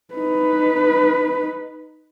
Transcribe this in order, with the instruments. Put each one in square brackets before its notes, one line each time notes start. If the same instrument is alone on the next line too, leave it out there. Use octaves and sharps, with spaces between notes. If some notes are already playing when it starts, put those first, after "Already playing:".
[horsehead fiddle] D#4 B4